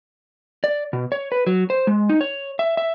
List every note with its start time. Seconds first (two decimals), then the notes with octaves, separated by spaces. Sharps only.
0.64 D5
0.93 B2
1.12 C#5
1.32 B4
1.47 F#3
1.70 C5
1.87 G#3
2.09 D#4
2.21 C#5
2.59 E5
2.77 E5